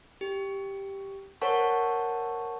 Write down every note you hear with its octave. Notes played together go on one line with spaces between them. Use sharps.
G4
A#4 C5 C#5 F#5 A5 C#6